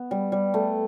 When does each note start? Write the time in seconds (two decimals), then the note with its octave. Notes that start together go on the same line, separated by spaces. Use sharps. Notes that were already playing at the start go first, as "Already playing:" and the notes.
Already playing: B3
0.11 G3
0.32 G3
0.54 A3